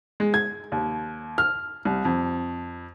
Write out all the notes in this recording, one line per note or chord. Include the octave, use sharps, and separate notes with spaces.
G#3
G#6
D#2
F6
C2
F2